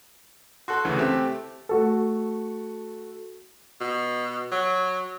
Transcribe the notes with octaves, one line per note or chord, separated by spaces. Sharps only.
F#4 A4 C6 F#6
D2 C#3 E3
A3 C4 G4
A3 F#4 A4
B2
F#3